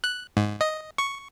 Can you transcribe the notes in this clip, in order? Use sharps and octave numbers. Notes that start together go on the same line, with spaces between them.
F#6
G#2
D#5
C#6